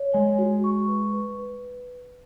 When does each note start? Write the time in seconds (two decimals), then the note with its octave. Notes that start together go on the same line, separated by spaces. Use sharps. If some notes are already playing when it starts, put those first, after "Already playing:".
Already playing: C#5
0.13 G#3 G#5
0.39 F#4
0.64 C#6
0.88 B4
1.13 B4
1.38 B4